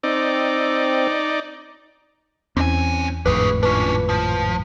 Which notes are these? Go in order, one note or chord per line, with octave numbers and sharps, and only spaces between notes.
C4 D#4 D5
E2 G2 C4 C#4 G#5
G#1 F2 A2 D4 G#4 B4 C#6
C#4 D4 F4 B4
F3